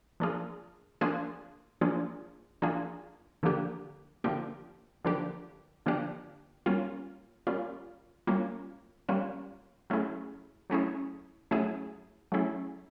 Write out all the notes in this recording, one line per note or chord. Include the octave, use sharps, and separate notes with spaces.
F3 A#3 D4 F4 G#4
F3 A#3 D4 F4 G#4
F3 A#3 D4 F4 G#4
F3 A#3 D4 F4 G#4
D3 F3 A#3 D4 G4
D3 F3 A#3 D4 G4
D3 F3 A#3 D4 G4
D3 F3 A#3 D4 G4
G3 A#3 C#4 F4
G3 A#3 C#4 F4
G3 A#3 C#4 F4
G3 A#3 C#4 F4
F#3 A3 C#4 E4 G#4
F#3 A3 C#4 E4 G#4
F#3 A3 C#4 E4 G#4
F#3 A3 C#4 E4 G#4